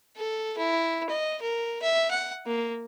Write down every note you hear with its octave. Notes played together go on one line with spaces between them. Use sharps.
A4
E4
D#5
A#4
E5
F#5
A#3